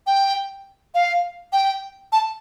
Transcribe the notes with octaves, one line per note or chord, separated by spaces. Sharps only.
G5
F5
G5
A5